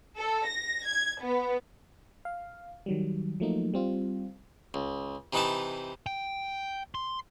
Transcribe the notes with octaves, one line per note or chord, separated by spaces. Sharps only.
A4
A#6
G#6
B3
F5
D#3 F#3 G3
F3 F#3 A3 A#3 D#4
G3 C4 F4
C#2
C3 E3 D#4 E4 B4 A5
G5
C6